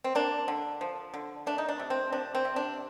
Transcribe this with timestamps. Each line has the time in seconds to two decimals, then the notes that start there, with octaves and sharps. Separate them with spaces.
0.04 C4
0.15 A#3 D4
0.48 D3
0.81 F3
1.14 D3
1.46 A3 D4
1.58 D#4
1.68 D4
1.79 C3
1.90 C4
2.12 F3 D4
2.35 C4
2.45 C3
2.56 D4